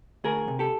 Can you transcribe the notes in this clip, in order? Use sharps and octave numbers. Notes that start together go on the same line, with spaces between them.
D2 G#4 A#4
C3
G4 A4